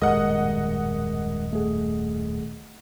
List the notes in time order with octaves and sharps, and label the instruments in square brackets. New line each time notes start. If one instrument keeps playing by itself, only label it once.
[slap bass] D#1 F#2 A2 [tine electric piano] G#3 A#4 [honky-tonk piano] D#5 F#5
[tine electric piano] A3 G#4